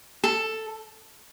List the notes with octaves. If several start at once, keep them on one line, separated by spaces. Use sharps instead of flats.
A4